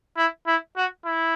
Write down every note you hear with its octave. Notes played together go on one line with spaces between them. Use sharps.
E4
E4
F#4
E4